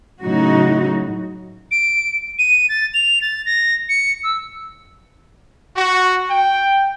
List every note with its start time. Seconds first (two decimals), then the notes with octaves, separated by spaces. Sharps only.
0.22 A2 C#3 F#3 D#4 F#4
1.71 D7
2.39 D#7
2.69 A6
2.94 F7
3.22 A6
3.46 A#6
3.89 C#7
4.23 E6
5.76 F#4
6.30 G5